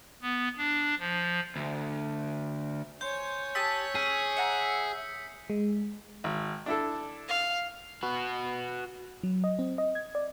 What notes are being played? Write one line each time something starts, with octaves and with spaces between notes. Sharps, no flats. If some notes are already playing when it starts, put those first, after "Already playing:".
B3
D4
F3
D2
C5 C#5 G#5 G6
G4 A5 D#6 E6 B6
C#4 G#4
E5 F#5 A#5 C#7
G#3
G#1
D4 E4 A4
F5
F#4 B4
F#3
D#5
C4
D#5
G#6
D5